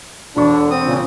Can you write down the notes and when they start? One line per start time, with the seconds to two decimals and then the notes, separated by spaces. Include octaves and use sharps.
0.36 E1 D3 D4 B5 C#6
0.70 C4 D#6
0.85 A#2 C#3